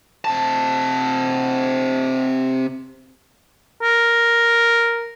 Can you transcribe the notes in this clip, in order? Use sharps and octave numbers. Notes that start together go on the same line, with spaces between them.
C3 A5
A#4